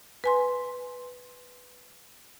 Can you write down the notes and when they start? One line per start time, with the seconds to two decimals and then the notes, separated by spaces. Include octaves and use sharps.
0.24 B4 G#5 C6